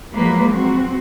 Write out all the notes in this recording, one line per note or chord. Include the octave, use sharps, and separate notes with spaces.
F3 F#3 G#3 A#3 B4
C4 F#4